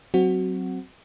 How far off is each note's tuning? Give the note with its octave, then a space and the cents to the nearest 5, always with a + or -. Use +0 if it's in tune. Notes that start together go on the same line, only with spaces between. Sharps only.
F#3 +15 C4 +0 F#4 +0